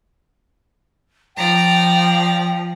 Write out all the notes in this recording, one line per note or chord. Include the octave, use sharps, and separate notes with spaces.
F3 D5 G5 A#5